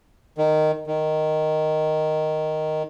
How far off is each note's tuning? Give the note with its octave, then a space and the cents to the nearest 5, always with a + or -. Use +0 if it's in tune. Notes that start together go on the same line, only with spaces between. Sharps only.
D#3 -10
D#3 -5